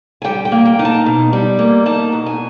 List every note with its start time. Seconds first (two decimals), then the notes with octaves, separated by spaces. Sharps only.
0.22 G#5
0.24 G3 G5
0.45 G5
0.52 A#3
0.65 G5
0.79 D#4
0.85 A5
1.06 B2
1.33 G3
1.59 A#3
1.86 D#4 A5
2.12 B2
2.26 G#5